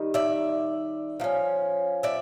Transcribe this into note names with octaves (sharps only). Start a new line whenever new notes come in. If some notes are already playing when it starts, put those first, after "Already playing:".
Already playing: D#3 G3 D#4
D5 E5
F3 A3 C#4
D5 E5